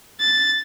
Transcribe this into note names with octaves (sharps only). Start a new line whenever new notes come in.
A6